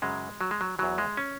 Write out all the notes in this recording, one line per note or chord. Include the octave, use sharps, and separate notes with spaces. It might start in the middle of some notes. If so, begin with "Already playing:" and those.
F#2 C#3 F#3 G#3
F#3
G#3
F#3
E2 E3 F#3
G#3
C#4